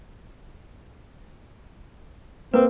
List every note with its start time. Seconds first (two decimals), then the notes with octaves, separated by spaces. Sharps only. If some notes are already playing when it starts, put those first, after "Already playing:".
2.54 A#3 C4 B4